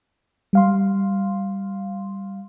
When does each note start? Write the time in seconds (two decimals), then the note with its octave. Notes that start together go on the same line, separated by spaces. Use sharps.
0.53 G3 F5 C6